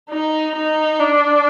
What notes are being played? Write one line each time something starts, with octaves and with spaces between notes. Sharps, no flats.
D#4
D#4
D4